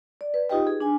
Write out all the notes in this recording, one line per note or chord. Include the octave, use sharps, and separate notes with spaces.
D5
B4
D#4 F4 G4 B4 D#5 G5
G#4
D4 G#5